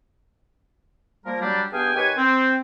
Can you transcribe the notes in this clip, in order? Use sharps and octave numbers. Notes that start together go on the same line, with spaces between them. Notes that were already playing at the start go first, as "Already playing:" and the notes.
F3 G3 A#3 A#4
F#3 G3 D4
G2 B3 G#4 F5 G5 G#5
D#3 G4 B4 C#5 G#5
C4